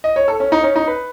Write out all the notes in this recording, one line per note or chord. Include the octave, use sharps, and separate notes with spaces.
D#5
C#5
A4
C#4
D#4
C#4
D#4
B4